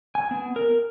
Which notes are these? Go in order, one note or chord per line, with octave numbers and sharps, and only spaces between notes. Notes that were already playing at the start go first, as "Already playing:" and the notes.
G#5
B3
A#4